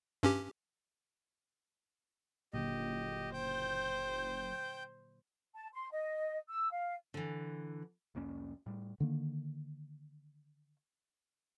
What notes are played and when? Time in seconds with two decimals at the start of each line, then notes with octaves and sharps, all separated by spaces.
0.23 G2 C#4 G4
2.54 F#1 A#2 D3 F#3 G4 D#5
3.34 C5 G5 G6
5.55 A5
5.73 C6
5.92 D#5
6.49 E6
6.71 F5
7.14 D3 E3
8.15 C2 F2 A#3 C#4
8.66 A2 G3
9.00 D3 D#3 A#3